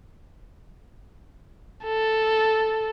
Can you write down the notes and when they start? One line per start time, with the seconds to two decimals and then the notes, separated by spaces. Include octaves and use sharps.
1.84 A4